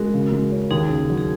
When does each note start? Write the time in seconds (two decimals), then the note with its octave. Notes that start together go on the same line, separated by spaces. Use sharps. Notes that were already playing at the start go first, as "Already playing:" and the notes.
Already playing: G#3 F#4 A#4
0.14 C#3
0.32 G#3
0.52 C#4
0.71 D#2 D#4 G#4
0.89 C#3
1.10 F#3
1.18 G#4